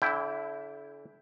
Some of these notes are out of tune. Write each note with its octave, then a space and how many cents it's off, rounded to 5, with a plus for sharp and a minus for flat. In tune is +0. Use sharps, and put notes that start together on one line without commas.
D3 -40 E4 +0 G5 +0